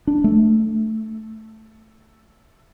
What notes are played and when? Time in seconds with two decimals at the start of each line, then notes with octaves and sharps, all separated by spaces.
0.07 D4
0.24 A3